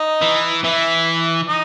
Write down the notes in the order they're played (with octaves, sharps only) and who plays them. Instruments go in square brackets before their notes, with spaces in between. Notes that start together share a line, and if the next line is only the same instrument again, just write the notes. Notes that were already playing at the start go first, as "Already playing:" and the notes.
Already playing: [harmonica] D#4 D#5
[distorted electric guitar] E3
[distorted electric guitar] E3 [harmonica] E4 E5
[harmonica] D#4 D#5